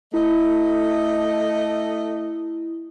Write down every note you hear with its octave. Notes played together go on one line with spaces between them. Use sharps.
A3 E4 D#5